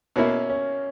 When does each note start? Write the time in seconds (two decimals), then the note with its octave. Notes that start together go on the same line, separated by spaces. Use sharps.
0.16 B2 A#3 C#4 E4
0.50 C#4